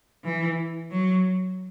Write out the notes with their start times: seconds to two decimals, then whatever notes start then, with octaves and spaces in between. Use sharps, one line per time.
0.24 E3
0.91 F#3